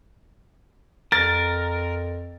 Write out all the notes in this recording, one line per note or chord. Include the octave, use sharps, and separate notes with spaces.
F2 A#4 A6